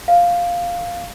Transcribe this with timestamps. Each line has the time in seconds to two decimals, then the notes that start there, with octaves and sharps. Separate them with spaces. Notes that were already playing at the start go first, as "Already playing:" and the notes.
0.08 F5